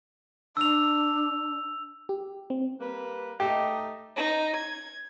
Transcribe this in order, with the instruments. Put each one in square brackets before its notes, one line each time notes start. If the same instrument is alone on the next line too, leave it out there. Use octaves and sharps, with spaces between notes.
[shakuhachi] D4 [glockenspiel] E6 F7
[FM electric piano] G4
C4
[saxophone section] G3 A#3 B4
[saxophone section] A3 D#4 D#5 [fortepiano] G4
[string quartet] D#4
G#6